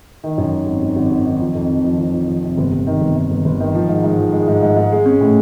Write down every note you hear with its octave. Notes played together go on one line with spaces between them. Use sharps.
D#3
F#2
D#3
G#1
G#1
G#1
G#1
D#3
F3
F2
F3
F3
F3
F3
F3
C3
G1
G1
D#3
G1
D#3
G1
G1
D#3
F3
G#2
G#2
F3
G#3
G#2
G#2
G#2
G#3
C#4
A2